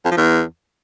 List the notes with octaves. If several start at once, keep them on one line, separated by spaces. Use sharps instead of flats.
F2
F3
E2